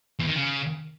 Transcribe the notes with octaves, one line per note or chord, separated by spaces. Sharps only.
E2
D#3
C#3